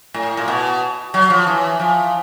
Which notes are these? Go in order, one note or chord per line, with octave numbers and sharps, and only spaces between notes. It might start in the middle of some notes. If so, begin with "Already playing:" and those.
A2
A#2
B2
F#3
F3
E3
F3